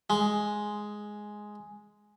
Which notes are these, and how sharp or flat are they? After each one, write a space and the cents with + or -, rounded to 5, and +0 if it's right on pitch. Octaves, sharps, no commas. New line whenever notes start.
G#3 +5